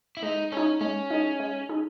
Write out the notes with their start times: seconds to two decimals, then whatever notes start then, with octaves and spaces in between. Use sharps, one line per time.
0.17 E4
0.23 G#3 D#4
0.52 C#4 D#4 G#4
0.81 G#3 C#4
1.10 D#4 G#4
1.40 G#3
1.69 D#4 G#4